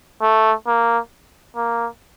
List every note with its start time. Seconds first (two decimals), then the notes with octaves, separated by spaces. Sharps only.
0.22 A3
0.67 A#3
1.56 A#3